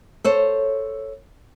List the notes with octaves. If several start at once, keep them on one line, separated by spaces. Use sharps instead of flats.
A4 C5 C#5